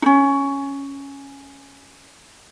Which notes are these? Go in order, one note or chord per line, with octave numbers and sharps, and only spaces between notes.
C#4 D#4